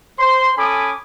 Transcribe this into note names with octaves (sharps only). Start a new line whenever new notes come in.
C5 C6
C#4 A4 G#5 B5 D6 D#6